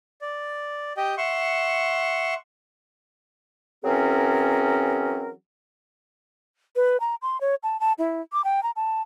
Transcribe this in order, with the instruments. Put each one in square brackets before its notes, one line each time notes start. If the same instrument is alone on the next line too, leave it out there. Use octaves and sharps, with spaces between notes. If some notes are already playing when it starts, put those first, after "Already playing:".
[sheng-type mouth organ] D5
G4 D#5 G5
E5 F#5 C6 C#6
[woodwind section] E3 F#3 C4 C#4 G#4 A#4
[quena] B4
A#5
C6
C#5
A5
A5
E4
D6
G5
A#5
A5